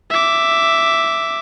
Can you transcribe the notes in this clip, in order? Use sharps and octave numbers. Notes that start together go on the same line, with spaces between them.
E5 D6